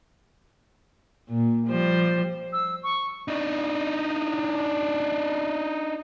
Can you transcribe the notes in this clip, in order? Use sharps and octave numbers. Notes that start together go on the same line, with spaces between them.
A#2
F3 G3 C5
E6
C#6
D4 D#4